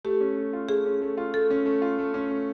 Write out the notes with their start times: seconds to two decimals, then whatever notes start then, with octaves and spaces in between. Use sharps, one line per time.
0.05 A3 G4
0.21 C#4
0.37 A3
0.53 F4
0.69 A3 G#4
0.85 C#4
1.01 A3
1.17 F4
1.34 A3 A4
1.51 C#4
1.66 A3
1.82 F4
1.99 A3
2.14 C#4
2.30 A3